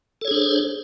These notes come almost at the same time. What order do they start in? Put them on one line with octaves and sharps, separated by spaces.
A4 C#5 G#4 D4 C5